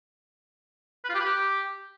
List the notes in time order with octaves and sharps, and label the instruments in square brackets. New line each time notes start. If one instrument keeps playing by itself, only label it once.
[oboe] B4
F4
G4
B4
G4